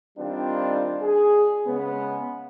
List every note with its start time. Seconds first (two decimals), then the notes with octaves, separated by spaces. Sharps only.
0.18 D#3 G3 C4 D4 F4
1.03 G#4
1.67 C#3 G#3 B3